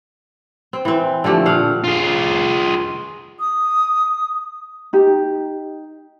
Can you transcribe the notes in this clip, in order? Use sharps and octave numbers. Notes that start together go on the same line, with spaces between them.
C4
E3 C4
D3 F3 A3 G4
A#2 F5 F#5
F4 G#4
D#6
D#4 G4